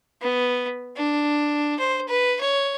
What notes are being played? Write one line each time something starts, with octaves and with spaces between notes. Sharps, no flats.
B3
D4
C5
B4
C#5